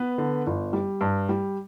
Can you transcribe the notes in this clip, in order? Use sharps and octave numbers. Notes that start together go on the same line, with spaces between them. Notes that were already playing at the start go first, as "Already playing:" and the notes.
Already playing: B3 B4
D3
G1
G3
G2
G3